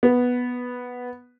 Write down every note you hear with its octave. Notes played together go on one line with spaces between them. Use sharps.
B3